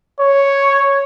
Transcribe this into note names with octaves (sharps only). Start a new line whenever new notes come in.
C#5